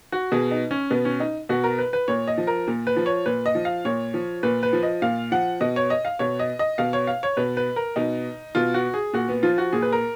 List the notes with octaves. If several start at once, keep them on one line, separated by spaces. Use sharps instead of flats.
F#4
B2 G#4
D#4
C#4
B2 B3
C#4
D#4
B2 F#4
A#4
B4
B4
A#2 C#5
D#5
F3
A#4
A#2
B4
F3
C#5
A#2 B4
D#5
F3
F5
A#2 C#5
F3
A#2 B4
B4
F3
D#5
A#2 F5
F3 F#5
B2 D#5
C#5
D#5
F5
B2 C#5
D#5
D#5
B2 F5
C#5
F5
C#5
B2 B4
B4
A#4
B2 D#4
B2 F4
F#4
G#4
A#2 F#4
B3
F3 F4
F#4
A#2 G#4
B4
A#4